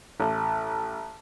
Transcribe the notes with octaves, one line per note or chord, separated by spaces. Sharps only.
A1